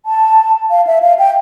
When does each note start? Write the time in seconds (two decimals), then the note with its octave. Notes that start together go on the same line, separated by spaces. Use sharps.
0.06 A5
0.70 F5
0.87 E5
1.02 F5
1.19 G5